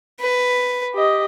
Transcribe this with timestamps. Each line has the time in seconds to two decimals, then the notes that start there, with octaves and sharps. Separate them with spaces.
0.20 B4
0.94 G4 D#5